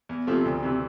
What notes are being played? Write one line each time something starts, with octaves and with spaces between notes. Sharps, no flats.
E2
C3 F3 A3
D2
C3 E3